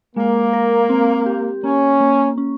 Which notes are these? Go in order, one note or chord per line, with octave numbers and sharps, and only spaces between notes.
G#3 A#3
A#4
C4
G4
A#3 C#4
A#3
C#4